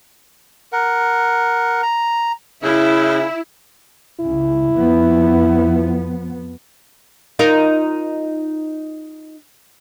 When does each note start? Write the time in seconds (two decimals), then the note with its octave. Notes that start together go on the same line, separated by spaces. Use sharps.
0.72 A#4 F#5
1.83 A#5
2.63 C#3 E4 E5
4.20 C#2 C#3 E4
4.73 F2 F3 B3
7.39 D#4 F4 A#4